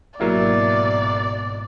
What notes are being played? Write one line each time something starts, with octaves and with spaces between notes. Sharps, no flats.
G#1 B2 F#3 A#3 E4 D5